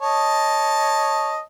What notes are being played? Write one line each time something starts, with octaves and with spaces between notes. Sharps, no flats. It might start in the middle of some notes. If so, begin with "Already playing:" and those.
C#5 D#5 A5